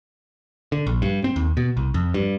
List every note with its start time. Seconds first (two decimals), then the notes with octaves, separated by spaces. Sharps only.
0.72 D3
0.87 A#1
1.02 G2
1.24 C4
1.36 D#2
1.57 B2
1.77 C2
1.94 F2
2.14 G2